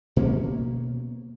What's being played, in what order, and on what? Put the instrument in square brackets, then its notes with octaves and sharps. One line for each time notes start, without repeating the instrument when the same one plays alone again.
[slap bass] B2 A#3 C#4